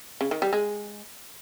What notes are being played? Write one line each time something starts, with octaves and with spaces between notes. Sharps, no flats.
C#3
D#3
G3
G#3